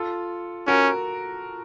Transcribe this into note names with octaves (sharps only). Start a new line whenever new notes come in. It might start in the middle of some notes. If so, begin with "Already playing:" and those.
Already playing: F4 A4
C#4 F#4 A#4